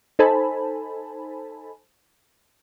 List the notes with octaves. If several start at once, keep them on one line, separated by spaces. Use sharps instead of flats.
D#4 A4 C5 G#5 A5 B5